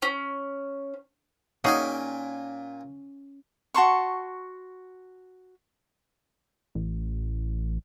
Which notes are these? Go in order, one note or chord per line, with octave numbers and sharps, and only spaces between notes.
C#4
A#2 C#4 D#4 F#4 G#4 G5 G#5
F#4 A5 C6 C#6
A1